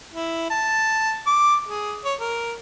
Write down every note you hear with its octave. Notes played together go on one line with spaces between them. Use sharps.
E4
A5
D6
G#4
C#5
A#4